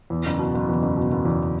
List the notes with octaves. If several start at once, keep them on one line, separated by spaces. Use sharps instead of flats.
E2
F#1
B2
F#1
E2
F#1
B2
F#1
E2